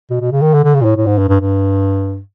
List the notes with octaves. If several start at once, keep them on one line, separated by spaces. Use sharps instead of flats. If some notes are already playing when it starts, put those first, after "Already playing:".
B2
B2
C#3
D#3
D3
D3
C#3
A#2
A2
A2
G#2
G2
G2
G2